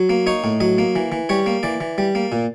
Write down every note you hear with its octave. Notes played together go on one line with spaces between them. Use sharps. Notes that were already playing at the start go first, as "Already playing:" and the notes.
Already playing: F#3
A#3
D#4 C#5
A2
F#3 D#5
A#3
E3
E3
G3 C#5
A#3
E3 D5
E3
G3
A#3
A#2